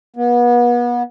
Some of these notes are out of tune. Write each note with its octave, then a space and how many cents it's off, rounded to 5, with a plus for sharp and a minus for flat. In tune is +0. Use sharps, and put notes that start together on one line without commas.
B3 -35